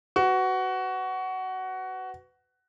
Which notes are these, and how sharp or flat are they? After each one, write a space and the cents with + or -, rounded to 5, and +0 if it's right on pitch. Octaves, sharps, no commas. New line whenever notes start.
F#4 +15 B4 +25